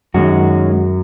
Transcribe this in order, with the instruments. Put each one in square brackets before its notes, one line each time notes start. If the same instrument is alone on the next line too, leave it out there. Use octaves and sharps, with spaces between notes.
[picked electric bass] F#2 [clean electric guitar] D#3 G#3 C#4 F#4